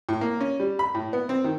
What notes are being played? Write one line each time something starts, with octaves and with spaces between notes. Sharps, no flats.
A2
A#3
C#4
G3
B5
A2
B3
C4
D#3